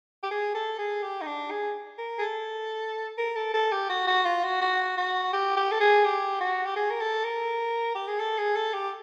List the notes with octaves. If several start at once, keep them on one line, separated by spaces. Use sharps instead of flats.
G4
G#4
A4
G#4
G4
D#4
D4
G#4
A#4
G#4
A4
A#4
A4
A4
G4
F#4
F#4
F4
F#4
F#4
F#4
G4
G4
A4
G#4
G4
F#4
G4
G#4
A#4
A4
A#4
G4
G#4
A4
G#4
A4
G4